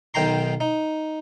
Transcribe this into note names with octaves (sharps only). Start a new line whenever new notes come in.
B1 D#3 G5 G#5 A#5 C6
D#4